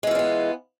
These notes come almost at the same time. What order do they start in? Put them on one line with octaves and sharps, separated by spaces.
G#3 E3 F4 D4 B3